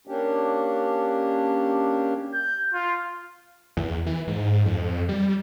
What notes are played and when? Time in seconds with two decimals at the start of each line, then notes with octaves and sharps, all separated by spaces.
0.07 A#3 C#4 D4 G4
2.34 G6
2.74 F4
3.77 E2
4.06 E3
4.27 G#2
4.65 F2
5.09 G3